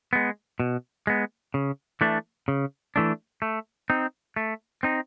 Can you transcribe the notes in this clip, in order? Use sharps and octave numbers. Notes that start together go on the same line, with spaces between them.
G#3 B3
B2
G#3 B3
C#3
E3 A3 D4
C#3
E3 A3 D4
A3
C4 D#4
A3
C4 D#4